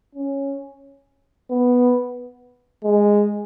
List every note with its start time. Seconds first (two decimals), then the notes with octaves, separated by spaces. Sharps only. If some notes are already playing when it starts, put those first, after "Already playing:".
0.15 C#4
1.50 B3
2.84 G#3